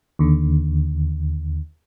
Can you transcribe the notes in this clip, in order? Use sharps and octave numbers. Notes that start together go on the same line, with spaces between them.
D#2 D3